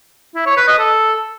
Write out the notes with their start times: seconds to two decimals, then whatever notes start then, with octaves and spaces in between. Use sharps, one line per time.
0.36 E4
0.46 C#5
0.57 B4
0.68 D#5
0.79 A4